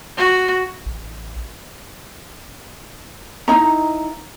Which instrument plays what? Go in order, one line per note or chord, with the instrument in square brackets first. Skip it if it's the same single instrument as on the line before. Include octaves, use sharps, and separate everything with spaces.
[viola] F#4
[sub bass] A1
[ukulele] D#4 E4 D#5 A#5